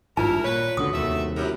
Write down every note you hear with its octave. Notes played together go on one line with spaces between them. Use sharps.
G#1 G2 E4 F4 A#4 A5
A#2 B4 C#5
C#2 G2 D3 F#4 D#6
D#2 C3 A3 E5
F#2 E4 G4 A#4